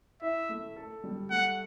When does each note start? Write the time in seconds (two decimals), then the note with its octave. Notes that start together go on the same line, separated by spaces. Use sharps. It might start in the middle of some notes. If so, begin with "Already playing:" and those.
0.21 E4 E5
0.49 A3
0.76 A4
1.04 G3
1.31 A3 F#5